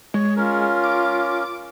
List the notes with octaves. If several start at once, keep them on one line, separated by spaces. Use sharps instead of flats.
G#3 C#5
C#4 F4 A#4
D6